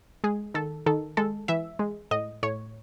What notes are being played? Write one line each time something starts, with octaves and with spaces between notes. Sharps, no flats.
G#3 G#4
D#3 A4
D#3 A4
G#3 A4
E3 E5
G#3
A2 D#5
A2 C#5